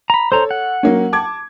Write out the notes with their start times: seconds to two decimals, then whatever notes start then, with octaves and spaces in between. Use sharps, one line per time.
0.10 A#5 B5
0.32 A4 C5 C#5 A#5
0.51 F#5
0.83 F#3 A#3 C#4
1.13 A5 D6 G#6